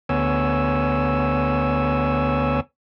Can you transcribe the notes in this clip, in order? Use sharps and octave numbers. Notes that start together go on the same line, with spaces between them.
D2 B3 C#5 G#5 E6